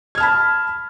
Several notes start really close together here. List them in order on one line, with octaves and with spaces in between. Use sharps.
G#6 F6 A5 B5